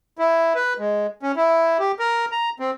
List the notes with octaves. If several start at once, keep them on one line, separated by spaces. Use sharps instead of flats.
E4
B4
G#3
C#4
E4
G4
A#4
A#5
C4